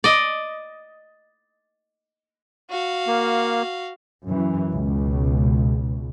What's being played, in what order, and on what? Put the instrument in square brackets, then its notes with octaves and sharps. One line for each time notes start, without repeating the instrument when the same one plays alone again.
[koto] D5 D#5
[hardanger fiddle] F#4 F5
[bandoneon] A#3
[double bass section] F#2 E3
C#2 B2